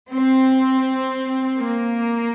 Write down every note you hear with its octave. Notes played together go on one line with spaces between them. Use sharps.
C4
A#3